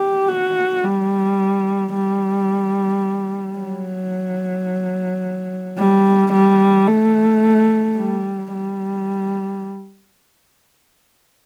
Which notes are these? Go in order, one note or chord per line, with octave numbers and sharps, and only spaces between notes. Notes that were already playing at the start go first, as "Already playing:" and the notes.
Already playing: G4
F#4
G3
G3
F#3
G3
G3
A3
G3
G3